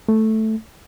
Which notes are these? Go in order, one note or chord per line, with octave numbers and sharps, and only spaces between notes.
A3